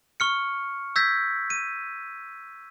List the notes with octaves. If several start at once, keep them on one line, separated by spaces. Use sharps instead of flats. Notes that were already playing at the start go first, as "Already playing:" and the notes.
C#6 F6 C#7
E6 G6 G#6 A#6 B6
D#7